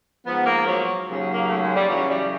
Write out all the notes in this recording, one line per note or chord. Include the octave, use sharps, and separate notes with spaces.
G#2 F3 B3
A#3
F#3
D#2 C#3 F#3
A#3
A3
G#3
G3
F#2 C#3 E3 F#3
G3